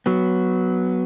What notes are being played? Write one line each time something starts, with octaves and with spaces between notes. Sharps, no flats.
F#3 B3